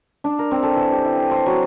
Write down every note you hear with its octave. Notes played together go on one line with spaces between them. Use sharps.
D4
A#4
C4
A4
E3
G4
E4
G#5
C5
F#3